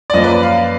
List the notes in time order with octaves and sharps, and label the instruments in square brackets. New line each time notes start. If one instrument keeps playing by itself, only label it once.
[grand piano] D5
F#2 F3 A#3 D#5
B4
D5
F5